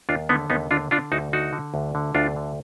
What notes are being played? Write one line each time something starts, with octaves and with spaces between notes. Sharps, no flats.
D#2 D4 F4
D3 B3 D#4
D#2 B3 D#4
D3 D4 F4
D3 D4 F4
D2 D#4 F#4
D3 D#4 F#4
D3
D2
D3
D2 D4 F4
D3